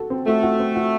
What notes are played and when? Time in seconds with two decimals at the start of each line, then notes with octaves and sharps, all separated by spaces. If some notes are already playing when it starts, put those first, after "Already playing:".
Already playing: F#4 A4
0.10 C4
0.27 A3 F#4
0.43 F#4
0.59 C4
0.75 F#4